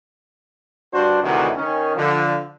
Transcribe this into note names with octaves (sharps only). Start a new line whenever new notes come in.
G2 D4 F#4 C5
D2 C3 D#3 E3 F#3 F#4
D#3 C#4
D3 F3